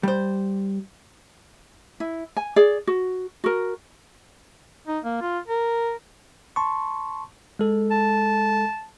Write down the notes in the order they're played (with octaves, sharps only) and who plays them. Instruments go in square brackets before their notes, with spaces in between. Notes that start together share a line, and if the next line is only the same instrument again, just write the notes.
[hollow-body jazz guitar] G3 C5
[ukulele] E4
G#5
G#4 D5
F#4
F#4 A#4
[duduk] D#4
A#3
F4
A#4
[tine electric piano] A5 C6 C#6
G#3 A4
[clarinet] A5